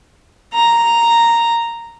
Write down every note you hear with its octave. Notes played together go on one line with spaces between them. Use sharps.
A#5